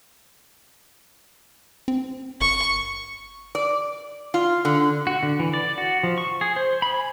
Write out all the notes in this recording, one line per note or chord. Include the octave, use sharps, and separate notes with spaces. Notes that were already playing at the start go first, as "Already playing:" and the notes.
C4
G1 C#6
D5
F4
D3
F#4
D3
E3
D5
F#4
F3
C#6
G#4
C5
B5
G#5